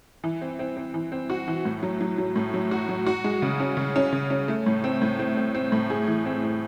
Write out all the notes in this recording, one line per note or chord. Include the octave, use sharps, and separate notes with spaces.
E3
C4
C4
C4
E3
C4
F#4
E3
A2
F#3
F#3
F#3
A2
F#3
F#4
F#3
F#4
G#3
C#3
C#4
C#3
C#4
C#3
C#4
A3
A2
C4
A2
C4
C4
C4
A2
G#4
E3
C4
C4